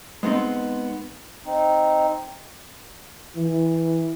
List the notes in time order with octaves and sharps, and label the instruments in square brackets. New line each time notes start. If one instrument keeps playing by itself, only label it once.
[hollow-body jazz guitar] G#3 B3 C4 D#4
[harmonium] C4 D#4
[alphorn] E3